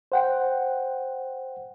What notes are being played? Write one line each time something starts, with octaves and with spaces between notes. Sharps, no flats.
C5 F#5 G5